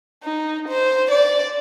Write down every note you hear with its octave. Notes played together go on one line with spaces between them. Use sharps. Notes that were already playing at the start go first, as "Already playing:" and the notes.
D#4
C5
D5